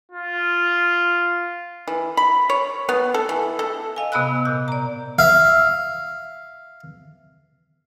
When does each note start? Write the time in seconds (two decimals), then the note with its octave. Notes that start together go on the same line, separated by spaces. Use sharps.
0.12 F4
1.87 E3
2.17 B5
2.49 C#5
2.89 B3
3.14 A4
3.29 E3
3.59 A4
3.96 D#5 F5 G#5
4.12 C3 B3 D#5 B5 E6 F#6
4.45 A#2 G6
4.68 D5 A#5
5.19 E5 F5